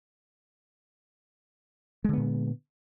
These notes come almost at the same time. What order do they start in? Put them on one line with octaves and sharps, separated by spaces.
G#3 D3 B3 A#2